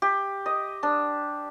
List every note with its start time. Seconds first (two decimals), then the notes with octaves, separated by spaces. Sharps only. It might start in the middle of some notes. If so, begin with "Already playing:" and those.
0.02 G4
0.46 D#5
0.83 D4